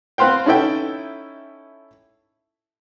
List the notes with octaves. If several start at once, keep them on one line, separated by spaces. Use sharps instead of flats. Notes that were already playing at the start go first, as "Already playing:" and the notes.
B3 C4 B4 C5 F5 G5
C#4 D#4 E4 A4 E5 G5